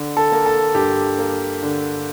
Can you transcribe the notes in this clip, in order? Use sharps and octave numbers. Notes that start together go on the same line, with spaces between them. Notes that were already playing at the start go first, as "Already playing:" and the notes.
Already playing: D3
A4
A#3
A4
G2 G4
A#3
D3